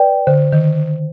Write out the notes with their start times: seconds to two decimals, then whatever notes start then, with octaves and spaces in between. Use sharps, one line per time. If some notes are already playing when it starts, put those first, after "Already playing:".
Already playing: B4 D5 G5
0.27 D3 C5
0.53 D#3